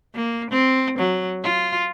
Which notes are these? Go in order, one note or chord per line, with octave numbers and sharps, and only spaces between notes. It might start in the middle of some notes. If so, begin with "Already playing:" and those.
A#3
C4
F#3
F4